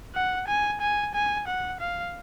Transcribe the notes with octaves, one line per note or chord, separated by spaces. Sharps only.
F#5
G#5
G#5
G#5
F#5
F5